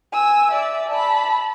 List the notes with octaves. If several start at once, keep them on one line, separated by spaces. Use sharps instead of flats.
G#5 E6
D5 E5
A5 B5